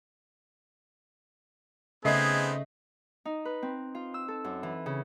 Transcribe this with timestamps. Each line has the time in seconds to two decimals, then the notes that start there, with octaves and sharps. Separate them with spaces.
2.05 C#3 A3 B3 C4 D#4 G#4 D#5 C7
3.25 D#4
3.45 B4
3.62 C4
3.95 F4
4.14 E6
4.28 A4
4.44 F#2
4.63 E3
4.86 C#3